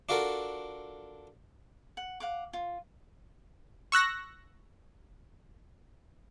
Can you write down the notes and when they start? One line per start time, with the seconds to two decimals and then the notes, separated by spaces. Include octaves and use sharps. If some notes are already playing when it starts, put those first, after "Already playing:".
0.09 D4 F4 F#4 A4 A#4
1.97 F#5
2.20 F5 F#5 D6
2.53 F4
3.92 C#6 E6 F#6 A#6